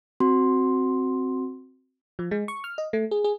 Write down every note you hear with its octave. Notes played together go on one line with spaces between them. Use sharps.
C4 F#4 C6
F3
G#3
C#6
F6
D#5
A3
G#4
G#4